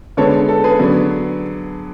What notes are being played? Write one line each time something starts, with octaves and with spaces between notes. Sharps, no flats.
D3 G#3 B3 A4 C#5
A4
G#4 B4
D3 F#3 B3